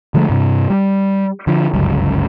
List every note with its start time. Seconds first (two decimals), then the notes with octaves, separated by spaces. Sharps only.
0.14 D3 F3 G#3 A3
0.29 G2 C3
0.70 G3
1.47 D3 F3
1.74 G1 C#2 F#2